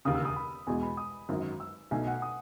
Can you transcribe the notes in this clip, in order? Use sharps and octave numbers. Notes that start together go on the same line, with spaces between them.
E1 D#2 C#3 D#6
E6
D#6
B5
E2 B2 G#3 G#5
B5
D#6
G#1 F#2 D#3 F#3
E6
B1 B2 A3 D#4 G#5
F#5
D#6